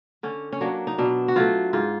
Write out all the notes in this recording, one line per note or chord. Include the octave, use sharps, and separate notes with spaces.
D3 C#4
C#4
F#3 A#3 D4
D#4
B2 D4
F#4
F#3 A3 F4
G#2 F4